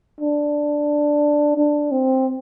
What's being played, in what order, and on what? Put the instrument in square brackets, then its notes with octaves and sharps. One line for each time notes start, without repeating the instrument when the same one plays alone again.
[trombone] D4
D4
C4